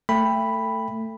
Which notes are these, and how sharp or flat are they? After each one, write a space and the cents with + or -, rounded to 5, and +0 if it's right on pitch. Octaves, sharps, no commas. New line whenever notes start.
A3 +20 G5 +20 B5 +0